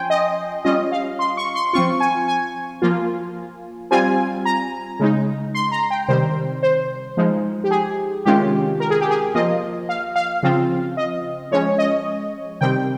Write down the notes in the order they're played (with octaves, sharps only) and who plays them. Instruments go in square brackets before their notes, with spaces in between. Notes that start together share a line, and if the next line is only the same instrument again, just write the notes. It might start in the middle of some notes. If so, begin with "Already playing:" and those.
Already playing: [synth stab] F3 C#4 G5 G#5 C6
D#5
G3 C#4 F4 D#5
F5
C6
C#6
C6
F3 C4 F4 C#6
G#5
G#5
F3 A#3 F4
G3 C4 F4 G#5
A#5
C#3 G#3 D#4
C6
A#5
G5
C3 D#3 G3 C5
C5
F3 G#3 D#4
G4
G#4
C3 D#3 G#3 C#4 F4 G4
A#4
G#4
G4
G#4
F3 A#3 F4 D#5
F5
F5
C#3 F3 C4 F4
D#5
F3 G#3 C#4 C#5
D#5
C3 D#3 G3 C4 G5